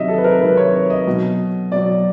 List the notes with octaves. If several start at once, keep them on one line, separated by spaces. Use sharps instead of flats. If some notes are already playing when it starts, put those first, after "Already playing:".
Already playing: C3 D#3 F#3 D#5 E5
A4
B4
A#4
C3 D#3 F#3 B4
C#5
C#5
D#5
B2 F#3
B2 F#3 D5